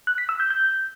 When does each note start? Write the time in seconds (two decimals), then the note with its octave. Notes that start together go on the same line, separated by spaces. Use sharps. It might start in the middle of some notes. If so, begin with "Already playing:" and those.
0.07 F#6
0.18 B6
0.29 E6
0.40 G6
0.50 G6